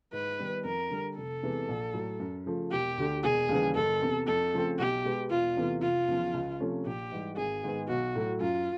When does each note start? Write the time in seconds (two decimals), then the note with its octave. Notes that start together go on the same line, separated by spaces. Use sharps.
0.13 G#2 B4
0.39 D#3 G3 B3
0.64 F2 A#4
0.90 D3 G3
1.17 F1 A4
1.43 E2 C3 E3 G#3
1.69 A#1
1.94 A2 F#3
2.20 F#2
2.46 C#3 F3 A3
2.72 E1 G4
2.98 D2 D3
3.23 E1 G#4
3.49 D#2 C#3 E3 G3
3.75 F#1 A4
4.01 E2 C3
4.27 F2 A4
4.53 C#3 F3 A3 C4
4.79 B1 G4
5.05 B2 G#3 B3
5.30 E1 F4
5.57 E2 C3 E3 A3
5.82 F1 F4
6.08 E2 C#3 F3
6.34 C#2
6.60 C3 F3 A3 C#4
6.85 A#1 G4
7.12 G#2 E3 G3
7.37 G#1 G#4
7.64 G#2 D#3 G#3 B3
7.89 B1 F#4
8.16 A2 F#3 A3
8.40 F#2 F4